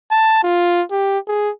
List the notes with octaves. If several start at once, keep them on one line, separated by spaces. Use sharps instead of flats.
A5
F4
G4
G#4